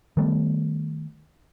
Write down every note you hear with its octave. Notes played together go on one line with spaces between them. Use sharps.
D#3 G3 A3 B3